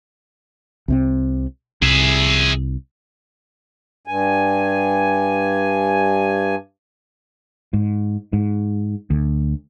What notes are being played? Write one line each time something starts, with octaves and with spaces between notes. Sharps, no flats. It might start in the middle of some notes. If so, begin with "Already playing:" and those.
C2 C3 C4
C2 G#4 E5
G2 G#5
G#2
G#2
D2